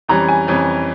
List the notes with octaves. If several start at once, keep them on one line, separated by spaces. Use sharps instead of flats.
F2 E3 G3 C#4 A#5
G#5
F2 E3 G3 C#4